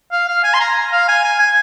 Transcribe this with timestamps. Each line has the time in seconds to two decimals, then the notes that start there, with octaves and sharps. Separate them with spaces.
0.12 F5
0.28 F5
0.44 G#5
0.54 C6
0.60 A#5
0.92 F5
1.08 G#5
1.24 G#5
1.39 G#5